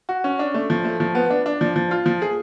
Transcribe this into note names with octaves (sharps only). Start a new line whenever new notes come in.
F#4
C#4
D4
A3
F3
A3
F3
B3
D4
D4
F3
F3
F4
F3
G#4